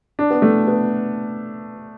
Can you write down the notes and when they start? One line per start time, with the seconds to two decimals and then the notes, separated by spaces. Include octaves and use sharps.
0.19 D4
0.30 B3
0.42 A3
0.67 B3